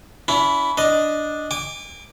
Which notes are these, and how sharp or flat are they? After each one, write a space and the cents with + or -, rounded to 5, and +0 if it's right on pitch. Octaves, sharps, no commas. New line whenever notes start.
C#4 +45 E4 +0
D4 +0 D#5 +0
G#5 -40 D6 +0